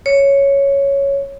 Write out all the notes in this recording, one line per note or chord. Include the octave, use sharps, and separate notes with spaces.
C#5